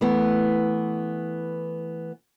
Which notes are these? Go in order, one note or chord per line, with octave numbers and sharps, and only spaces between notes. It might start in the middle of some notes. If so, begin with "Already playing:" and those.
E3 A3 B3